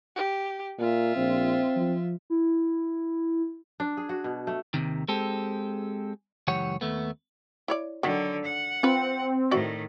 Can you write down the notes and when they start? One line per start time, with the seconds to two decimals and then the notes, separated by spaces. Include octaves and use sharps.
0.16 G4
0.79 A#2 F4 E5
1.16 A#1 C4
1.76 F3
2.30 E4
3.80 D4
3.97 G#4
4.09 F#4
4.24 B2
4.47 A3
4.74 D#2 G#2 C3 D#3
5.08 G#3 C4 G4 A4
6.48 C#2 F#2 E3 G4 C#5 F#5
6.81 D#2 A3 B3
7.68 E4 C#5 D5
8.03 D3 D#3 F#3 F#4
8.45 F#5
8.83 C4 F4 B4
9.51 A2 D#3 F#4 D5 E5